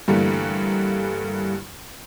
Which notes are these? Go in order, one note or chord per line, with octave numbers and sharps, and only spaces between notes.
G2 D3 E3 G3 A3 A#3